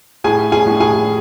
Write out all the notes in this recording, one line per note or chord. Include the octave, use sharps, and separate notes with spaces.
A2 G#4 G#5
G#4 G#5
A2
G#4 G#5